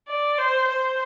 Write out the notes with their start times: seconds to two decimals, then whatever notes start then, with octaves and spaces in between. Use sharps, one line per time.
0.08 D5
0.38 C5
0.68 C5